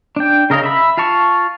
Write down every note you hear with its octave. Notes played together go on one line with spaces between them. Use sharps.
D4 G5
C#3 A#4 D#5 F5
E5 B5
F4 F5 A5 C#6